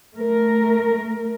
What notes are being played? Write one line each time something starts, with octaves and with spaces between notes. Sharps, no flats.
A3 A#4